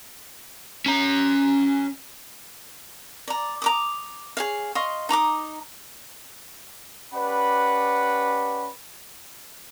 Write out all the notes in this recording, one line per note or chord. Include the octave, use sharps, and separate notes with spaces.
C#4 A#5
D5 A#5
A#5 D6 D#6
G#4 C#5 F5
D#5 F5 C6 C#6
D#4 A#5 D6 D#6
C#4 G4 B4 D5 F#5 B5